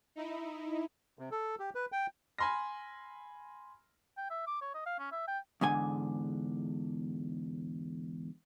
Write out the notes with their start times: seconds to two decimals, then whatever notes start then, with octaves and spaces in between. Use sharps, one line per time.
0.16 D#4 E4
1.19 C3
1.31 A4
1.59 G4
1.75 B4
1.92 G5
2.39 G#5 B5 C6 F6 A#6
4.17 G5
4.30 E5
4.47 D6
4.61 C#5
4.74 D#5
4.86 F5
4.99 C#4
5.12 E5
5.28 G5
5.61 E2 G#2 D3 G#5